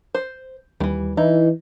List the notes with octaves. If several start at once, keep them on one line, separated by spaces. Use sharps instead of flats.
C5
D#2 D#3 E3 G3
E3 D#4 E4